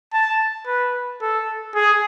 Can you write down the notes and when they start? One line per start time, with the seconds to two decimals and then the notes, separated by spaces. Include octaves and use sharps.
0.13 A5
0.66 B4
1.22 A4
1.75 G#4